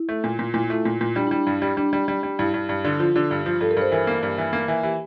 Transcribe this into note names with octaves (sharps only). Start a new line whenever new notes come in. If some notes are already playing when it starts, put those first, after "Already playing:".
Already playing: E4
A3
A#2
A#2
A#2 E4
F4
A3 E4
A#2
A#2
G3 D4
G3 E4
D4
G2
G3
G3 D4
G3
G3
G3
G2 E4
G2
G2
D3
F3 F4
D3
G2
F3
G2 A4
A#4
G2 C5
E3 A#4
A#3
G2
E3
A#3
E3
E3 G4